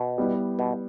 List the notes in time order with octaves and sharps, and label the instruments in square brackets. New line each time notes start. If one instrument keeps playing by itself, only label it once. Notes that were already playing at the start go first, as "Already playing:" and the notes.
Already playing: [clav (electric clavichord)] B2
[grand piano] G3 B3 E4
[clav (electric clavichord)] B2